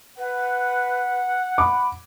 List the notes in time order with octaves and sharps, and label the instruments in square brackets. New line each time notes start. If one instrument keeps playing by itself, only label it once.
[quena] B4 [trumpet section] F#5
[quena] B5 [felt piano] D6